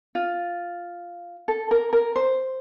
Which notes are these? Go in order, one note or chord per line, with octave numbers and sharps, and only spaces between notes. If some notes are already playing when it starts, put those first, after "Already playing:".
F4
A4
A#4
A#4
C5